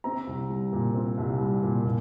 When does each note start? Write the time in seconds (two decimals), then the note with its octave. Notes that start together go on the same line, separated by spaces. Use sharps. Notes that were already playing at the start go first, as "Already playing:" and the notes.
0.04 C4 A#5
0.27 C2
0.50 G3
0.73 A#2
0.95 C4
1.18 C2
1.40 G3
1.63 A#2
1.85 A#2